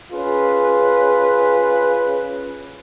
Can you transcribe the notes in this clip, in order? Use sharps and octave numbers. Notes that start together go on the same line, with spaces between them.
C#4 F4 G#4 B4